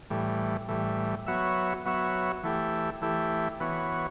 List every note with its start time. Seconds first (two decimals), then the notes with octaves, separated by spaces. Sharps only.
0.10 A2 E3 G3
0.68 A2 E3 G3
1.27 F#3 B3 F#4 C#5 E5
1.85 F#3 B3 F#4 C#5 E5
2.43 E3 A3 E4 G4
3.02 E3 A3 E4 G4
3.60 E3 B3 F#4 C#5